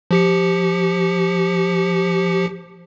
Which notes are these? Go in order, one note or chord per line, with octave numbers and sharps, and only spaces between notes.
F3 G4 C#7